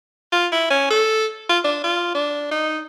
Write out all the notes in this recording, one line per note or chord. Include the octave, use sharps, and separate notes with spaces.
F4
E4
C#4
A4
F4
D4
F4
D4
D#4